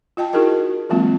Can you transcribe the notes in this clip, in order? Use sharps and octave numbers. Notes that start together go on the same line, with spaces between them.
F4 D#5 G5 A5
D#4 E4 F#4 G#4 A#4 D#5
E3 F#3 G#3 A#3 C4 F4